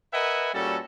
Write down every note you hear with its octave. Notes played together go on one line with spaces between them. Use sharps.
A#4 B4 D#5 E5 F#5 G#5
A#2 G3 C#4 F#4 A4